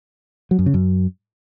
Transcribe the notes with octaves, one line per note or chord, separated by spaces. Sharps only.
F#3
F#2
C#3
F#2